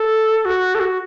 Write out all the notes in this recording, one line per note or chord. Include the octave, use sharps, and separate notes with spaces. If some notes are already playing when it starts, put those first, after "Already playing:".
Already playing: A4
F#4
A4
F#4